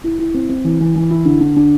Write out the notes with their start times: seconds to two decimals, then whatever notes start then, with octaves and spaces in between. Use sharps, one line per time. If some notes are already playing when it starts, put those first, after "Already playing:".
0.04 E4
0.19 E4
0.34 C4
0.49 C4
0.64 E3
0.80 E3
0.96 E3
1.10 E4
1.25 D3
1.41 D3
1.56 D4